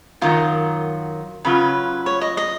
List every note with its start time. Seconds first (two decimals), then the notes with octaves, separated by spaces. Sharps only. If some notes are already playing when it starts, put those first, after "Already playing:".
0.21 F#2 D#3 F#3 F4
1.45 C#3 F#3 C#4 F4 B4
2.06 C#5
2.21 D#5
2.37 D#5